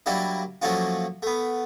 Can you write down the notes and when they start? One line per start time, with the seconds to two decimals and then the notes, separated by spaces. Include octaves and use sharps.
0.06 F#3 G3 A#3 D4 E4
0.62 F3 F#3 A3 A#3 C#4 F4
1.23 A3 B3